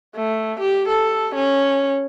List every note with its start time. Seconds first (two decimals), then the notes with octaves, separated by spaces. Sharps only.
0.15 A3
0.60 G4
0.89 A4
1.36 C#4